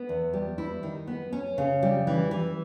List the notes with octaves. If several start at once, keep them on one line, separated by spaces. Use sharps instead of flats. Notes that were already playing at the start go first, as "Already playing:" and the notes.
Already playing: B3
E2
G3
E4
D#3
B3
C#4
C#3
G3
E3
E3